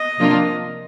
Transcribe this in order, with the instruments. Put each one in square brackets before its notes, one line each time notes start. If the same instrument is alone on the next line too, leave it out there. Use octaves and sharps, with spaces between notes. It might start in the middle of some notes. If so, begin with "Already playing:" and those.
Already playing: [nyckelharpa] D#5
[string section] C3 F3 A#3 D4 F4